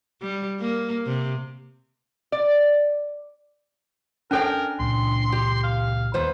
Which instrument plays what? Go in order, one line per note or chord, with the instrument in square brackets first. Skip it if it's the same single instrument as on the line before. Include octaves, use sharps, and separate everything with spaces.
[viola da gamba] G3
A#3
C3
[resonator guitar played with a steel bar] D5
[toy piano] C#4 A4 C5 [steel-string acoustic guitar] D4 G5 G#5 [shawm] A#4
[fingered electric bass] C#2 A#2 [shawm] C6
[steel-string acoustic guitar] G4
[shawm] F5
[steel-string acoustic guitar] D#2 B4 C5